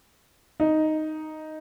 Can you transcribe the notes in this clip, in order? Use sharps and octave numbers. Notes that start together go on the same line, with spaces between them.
D#4